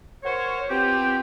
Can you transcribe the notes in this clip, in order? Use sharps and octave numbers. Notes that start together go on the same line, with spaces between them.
F#4 A#4 C5 C#5
B2 C4 F4 G4